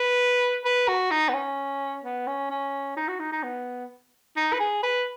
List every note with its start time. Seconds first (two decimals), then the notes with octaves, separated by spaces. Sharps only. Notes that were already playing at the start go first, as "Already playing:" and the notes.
Already playing: B4
0.65 B4
0.88 F#4
1.11 D#4
1.29 B3
1.34 C#4
2.04 B3
2.27 C#4
2.50 C#4
2.97 D#4
3.08 F#4
3.20 D#4
3.32 D#4
3.43 B3
4.37 D#4
4.53 B4
4.60 G#4
4.83 B4